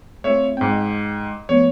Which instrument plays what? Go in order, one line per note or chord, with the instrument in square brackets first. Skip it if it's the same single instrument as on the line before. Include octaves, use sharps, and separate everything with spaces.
[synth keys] A3 C4 F4 [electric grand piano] C#5 E5
[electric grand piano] G#2 G5 [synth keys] C4
[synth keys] D#5
[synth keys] F3 A3 B3 [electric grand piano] C#5